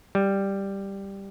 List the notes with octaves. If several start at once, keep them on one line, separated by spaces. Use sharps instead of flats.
G3